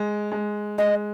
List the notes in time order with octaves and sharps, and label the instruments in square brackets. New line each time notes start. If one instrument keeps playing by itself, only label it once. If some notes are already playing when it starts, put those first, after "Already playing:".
Already playing: [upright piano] G#3
G#3
[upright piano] G#3 [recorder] D#5